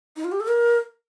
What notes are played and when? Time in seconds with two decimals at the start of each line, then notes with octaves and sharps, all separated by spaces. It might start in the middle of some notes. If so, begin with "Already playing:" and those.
0.16 D#4
0.24 F4
0.32 G4
0.40 A4
0.47 A#4